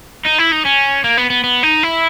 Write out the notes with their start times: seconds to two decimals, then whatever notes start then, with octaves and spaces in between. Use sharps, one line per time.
0.25 D#4
0.38 E4
0.51 D#4
0.65 C#4
1.04 A#3
1.17 B3
1.30 B3
1.44 B3
1.63 D#4
1.83 E4